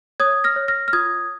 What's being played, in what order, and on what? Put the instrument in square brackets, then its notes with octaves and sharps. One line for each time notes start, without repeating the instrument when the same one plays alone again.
[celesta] C#5 D#6 G#6
F6 A#6
C#5
F6 A#6
F6
F4 D#6 G#6